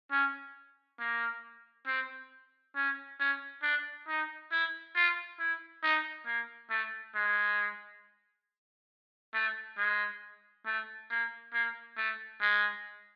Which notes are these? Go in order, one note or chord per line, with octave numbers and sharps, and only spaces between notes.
C#4
A#3
C4
C#4
C#4
D4
D#4
E4
F4
E4
D#4
A#3
A3
G#3
A3
G#3
A3
A#3
A#3
A3
G#3